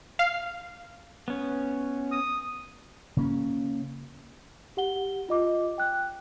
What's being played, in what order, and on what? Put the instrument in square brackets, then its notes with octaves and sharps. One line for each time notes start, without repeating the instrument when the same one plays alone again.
[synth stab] F5
[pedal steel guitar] B3 C#4
[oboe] D#6
[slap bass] C#3 A#3 C#4
[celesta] G4 F#5 G7
F4 D#5 D6
G5 F#6